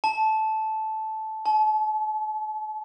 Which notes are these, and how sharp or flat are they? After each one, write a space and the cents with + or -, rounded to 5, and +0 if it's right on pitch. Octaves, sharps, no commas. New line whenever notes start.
A5 -10
A5 -40